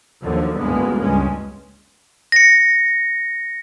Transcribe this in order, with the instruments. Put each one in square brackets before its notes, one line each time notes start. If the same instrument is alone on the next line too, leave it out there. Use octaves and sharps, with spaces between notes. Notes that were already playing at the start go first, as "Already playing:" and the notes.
[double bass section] D#2 D3 F3 F#3
A1 D2 G2 G#3 A#3 B3
C#2 G2 G#3 C#4
[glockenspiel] A#6 C#7